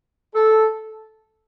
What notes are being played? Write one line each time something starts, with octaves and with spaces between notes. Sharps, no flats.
A4